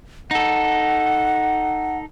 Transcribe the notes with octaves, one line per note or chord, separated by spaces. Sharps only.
D#4 A4 F#5